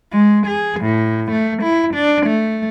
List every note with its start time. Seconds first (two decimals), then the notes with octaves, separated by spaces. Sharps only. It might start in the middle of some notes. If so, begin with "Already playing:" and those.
0.12 G#3
0.47 G#4
0.80 A2
1.31 A3
1.62 E4
1.94 D4
2.26 A3